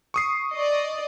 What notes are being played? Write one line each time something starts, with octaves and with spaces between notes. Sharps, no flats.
C#6 D#6 C7
D5 D#5